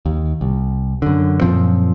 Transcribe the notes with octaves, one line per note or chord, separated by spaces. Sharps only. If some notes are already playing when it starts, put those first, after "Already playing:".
D#2
C2
F#2 D3
F#2 A#2 F3 C4